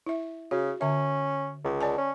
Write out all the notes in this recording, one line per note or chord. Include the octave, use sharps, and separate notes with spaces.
E4 E5
C#3 F#4
D3 C#4 E5
C#2
D5 G#5 A5
C#4